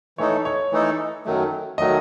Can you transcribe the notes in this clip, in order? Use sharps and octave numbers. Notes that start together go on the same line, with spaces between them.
E3 A3 D#4 A4 C#5
C#5
E3 A3 D#4 A4
F#2 D#3 F#3 A3
D#3 F#3 A3 D#5